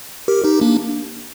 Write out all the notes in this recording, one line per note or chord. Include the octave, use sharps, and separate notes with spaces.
G4 A#4
D#4 G4
A#3 D4